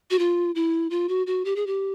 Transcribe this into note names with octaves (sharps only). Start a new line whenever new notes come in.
F#4
F4
E4
F4
F#4
F#4
G4
G#4
G4